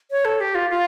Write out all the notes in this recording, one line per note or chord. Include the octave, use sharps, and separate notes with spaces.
C#5
A4
G4
F4
F4